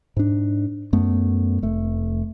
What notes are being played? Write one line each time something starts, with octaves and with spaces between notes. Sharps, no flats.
G#2 D4
F#2 A3 B3
F1 A3